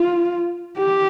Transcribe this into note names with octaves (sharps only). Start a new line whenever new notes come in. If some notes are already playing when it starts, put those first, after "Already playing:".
Already playing: F4
G4